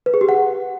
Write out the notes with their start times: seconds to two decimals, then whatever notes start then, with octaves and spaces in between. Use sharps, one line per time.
0.06 B4
0.14 G#4
0.21 G4
0.29 F#5